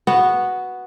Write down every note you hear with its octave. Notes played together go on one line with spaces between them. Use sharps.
B3 F#4